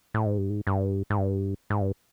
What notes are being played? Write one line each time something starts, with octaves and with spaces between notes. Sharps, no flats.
A2
G#2
G2
G#2
G2
G#2
G2
G#2
G2